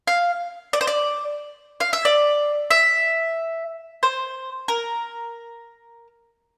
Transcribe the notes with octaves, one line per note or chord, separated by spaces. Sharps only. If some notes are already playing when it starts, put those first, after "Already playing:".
F5
D5
C5
D5
F5
E5
D5
E5
C5
A#4